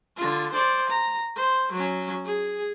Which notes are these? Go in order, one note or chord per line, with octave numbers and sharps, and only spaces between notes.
D3 F4
C5 D5
A#5
C5
F#3 C#4
G#4